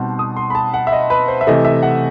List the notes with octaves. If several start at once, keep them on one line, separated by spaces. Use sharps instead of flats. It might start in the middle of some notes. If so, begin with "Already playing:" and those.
Already playing: B2 G3 C4 D#4 F#5 A5 C6
D#6
C6
B5
A5
F#5
E5
D#5
B4
C5
E5
C3 E3 A3 D#5
E5
F#5